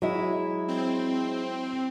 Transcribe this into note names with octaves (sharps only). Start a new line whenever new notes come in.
F#3 G#3 E4
C4